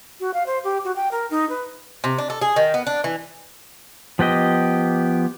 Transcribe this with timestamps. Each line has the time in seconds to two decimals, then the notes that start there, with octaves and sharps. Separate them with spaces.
0.20 F#4
0.34 F5
0.46 C5
0.64 G4
0.85 F#4
0.96 G5
1.11 A#4
1.31 D#4
1.49 B4
2.04 C3
2.18 D4
2.30 A4
2.41 G#4
2.56 D#3
2.74 B3
2.87 D4
3.04 E3
4.19 F3 B3 G4 D#5